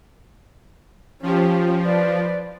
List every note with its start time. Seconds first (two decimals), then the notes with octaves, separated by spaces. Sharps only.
1.23 F3 C#4 G4
1.84 B4 D5